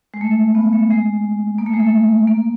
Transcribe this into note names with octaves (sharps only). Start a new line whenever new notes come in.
G#3
A3
B3
A3
G#3
A#3
A3
G#3
A3
A#3